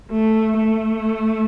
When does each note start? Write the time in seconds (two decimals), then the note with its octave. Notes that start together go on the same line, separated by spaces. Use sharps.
0.11 A3
0.57 A3